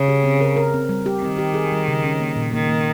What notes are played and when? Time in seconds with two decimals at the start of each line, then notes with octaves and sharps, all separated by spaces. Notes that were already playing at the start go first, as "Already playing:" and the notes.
Already playing: C#3
0.08 G4
0.24 C4
0.41 A#4
0.56 A#4
0.74 C4
0.89 G3
1.06 G4
1.22 D#3 C4
1.38 G4
1.54 G#4
1.72 G3
1.88 C#3
2.04 C#4
2.20 A#3
2.36 A#2
2.53 D#3 A#3
2.68 A#3